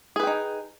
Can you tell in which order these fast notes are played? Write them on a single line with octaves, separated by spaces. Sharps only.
G#4 B4 G5 D#4